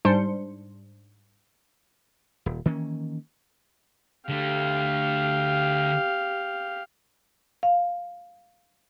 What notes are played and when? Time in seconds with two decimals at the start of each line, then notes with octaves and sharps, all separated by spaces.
0.05 G#2 G3 D4 C5 C6 C#7
2.46 D#1
2.65 D#3 E3 A#3 C#4
4.29 D3 A3 G4 F5
7.63 F5